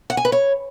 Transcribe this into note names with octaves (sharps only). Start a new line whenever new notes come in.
F#5
G#5
B4
C#5